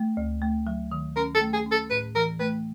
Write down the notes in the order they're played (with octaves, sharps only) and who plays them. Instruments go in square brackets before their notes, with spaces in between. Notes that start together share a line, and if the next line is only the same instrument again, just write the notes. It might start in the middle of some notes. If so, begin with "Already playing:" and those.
Already playing: [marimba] A3
D2
A3
F#3
D#3
[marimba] C#4 [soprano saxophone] A#4
[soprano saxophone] A4
[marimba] A3
[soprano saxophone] G#4
[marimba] C#4
[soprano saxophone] A4
[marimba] A2 [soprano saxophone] B4
[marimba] E3 [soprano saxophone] A#4
[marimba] A3 [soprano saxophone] B4